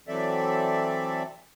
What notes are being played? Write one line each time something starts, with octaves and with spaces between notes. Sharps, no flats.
E3 F#3 C4 A4 D5 E5